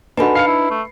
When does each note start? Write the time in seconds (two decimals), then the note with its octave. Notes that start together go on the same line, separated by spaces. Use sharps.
0.17 D4 D#4 F#4 A4 B4 C5 G#5 B5
0.35 F5 C7 C#7
0.47 E4
0.70 A3